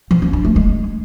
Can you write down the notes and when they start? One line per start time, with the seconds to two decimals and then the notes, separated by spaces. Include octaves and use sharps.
0.11 F3
0.22 C#4
0.33 D4
0.45 A3
0.56 G#3